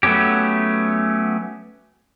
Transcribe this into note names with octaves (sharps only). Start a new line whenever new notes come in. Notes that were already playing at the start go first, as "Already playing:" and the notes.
F#3 A3 B3 C#4 G4